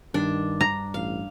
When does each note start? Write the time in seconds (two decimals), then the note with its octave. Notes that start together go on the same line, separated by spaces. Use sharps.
0.14 G2 D#3 D4
0.61 A#5
0.94 A1 F5